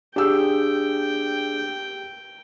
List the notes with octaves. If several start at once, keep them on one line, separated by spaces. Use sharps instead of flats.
D4 G4 G#4 G5 E6